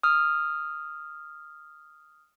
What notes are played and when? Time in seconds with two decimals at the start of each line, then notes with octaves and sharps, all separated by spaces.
0.03 D#6 F6